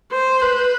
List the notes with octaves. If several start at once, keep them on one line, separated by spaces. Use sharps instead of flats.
C5
B4